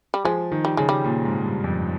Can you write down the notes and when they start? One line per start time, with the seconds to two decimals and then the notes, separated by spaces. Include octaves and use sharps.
0.14 G3
0.24 F3 G#3
0.52 D#3
0.65 G3
0.77 C#3 G#3
0.89 G3
1.04 A#2
1.25 G#2
1.44 G2
1.64 F2